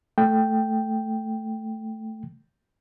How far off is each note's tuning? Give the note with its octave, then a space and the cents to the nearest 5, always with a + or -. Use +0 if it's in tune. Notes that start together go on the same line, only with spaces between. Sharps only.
A3 +0 G5 +0